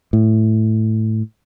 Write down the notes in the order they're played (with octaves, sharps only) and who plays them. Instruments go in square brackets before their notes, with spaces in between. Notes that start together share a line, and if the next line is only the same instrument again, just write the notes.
[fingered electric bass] A2